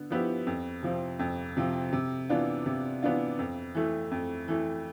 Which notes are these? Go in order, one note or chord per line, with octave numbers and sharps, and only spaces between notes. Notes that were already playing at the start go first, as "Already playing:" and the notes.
Already playing: D3 B3
F3 B3 E4 G4
F2
C3 F3 C4
F2
C3 F3 C4
C3
E3 B3 D4 F4
C3
E3 B3 D4 F4
F2
E3 A3
F2
E3 A3